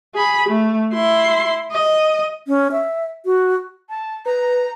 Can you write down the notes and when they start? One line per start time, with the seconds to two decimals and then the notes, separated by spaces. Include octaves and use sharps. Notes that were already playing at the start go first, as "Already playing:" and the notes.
0.15 G#4 B5
0.49 A3
0.94 E4 C6
1.72 D#5
2.48 C#4
2.72 E5
3.25 F#4
3.89 A5
4.26 B4 A#5